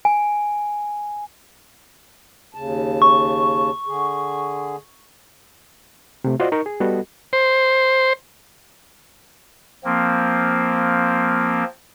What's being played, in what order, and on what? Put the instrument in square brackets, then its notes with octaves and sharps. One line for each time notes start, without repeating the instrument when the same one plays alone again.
[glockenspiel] G#5
[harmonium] D#2 C#3 A5
[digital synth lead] C#6
[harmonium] D3 G#4
[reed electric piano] C3 A3
F4 F#4 C5 D5 D#5
D#4 A#4 C#6
G#4
G3 B3 F#4 A4 D#5
[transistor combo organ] C5
[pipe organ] F3 A#3 C4